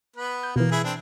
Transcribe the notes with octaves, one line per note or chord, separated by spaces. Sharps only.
B3 B4
G6
B2 E3 A#3
E4 G#4 B4
C4 D4